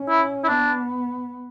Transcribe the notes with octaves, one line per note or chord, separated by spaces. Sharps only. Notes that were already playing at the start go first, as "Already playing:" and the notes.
Already playing: C#4
E4
E4
B3 D4